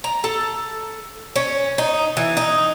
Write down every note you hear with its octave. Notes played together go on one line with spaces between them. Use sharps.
A#5
A4
C#4
D#4
E3
D#4